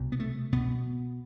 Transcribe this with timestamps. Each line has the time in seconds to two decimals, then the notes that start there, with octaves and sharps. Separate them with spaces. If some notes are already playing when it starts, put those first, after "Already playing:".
Already playing: C2 B2
0.12 B3
0.20 A3
0.53 B2 B3